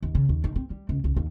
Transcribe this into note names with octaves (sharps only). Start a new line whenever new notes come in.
D#2
C#3
D#2
D#3
C4
G3
C#2
C#2
D#2